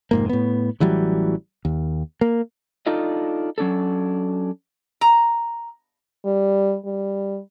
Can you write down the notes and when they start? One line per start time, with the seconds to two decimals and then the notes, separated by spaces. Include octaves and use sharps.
0.11 F1 G#2 A#3
0.29 A2 B3
0.80 A1 E3 F#3 G3
1.65 D#2
2.21 A#3
2.87 D4 D#4 F4 A4 D#5
3.58 F#3 C#4 D4 A4
5.01 A#5
6.25 G3
6.85 G3